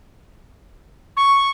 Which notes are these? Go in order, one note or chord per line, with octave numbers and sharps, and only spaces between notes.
C#6